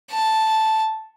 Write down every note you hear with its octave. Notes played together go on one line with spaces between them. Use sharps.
A5